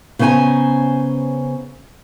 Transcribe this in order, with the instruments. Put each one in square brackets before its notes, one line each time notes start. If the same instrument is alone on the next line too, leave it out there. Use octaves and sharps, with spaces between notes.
[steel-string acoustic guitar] C#3 B3 C#4 C5 G#5 A#5